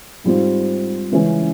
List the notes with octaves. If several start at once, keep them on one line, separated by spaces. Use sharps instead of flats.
G#2 G3 C4 F4
C#3 E3 G#3 C#4